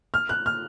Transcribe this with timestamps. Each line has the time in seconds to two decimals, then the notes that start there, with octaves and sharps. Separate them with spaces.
0.14 F6
0.29 F#6
0.46 F6